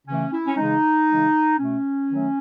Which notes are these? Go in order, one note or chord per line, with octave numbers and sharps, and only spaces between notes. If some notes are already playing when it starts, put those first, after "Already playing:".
C#3 E3 A3 C#4
E4
C#4
C#3 E3 G#3 D#4
C#3 E3 G#3
B2 A3 C#4
D#3 F#3 A3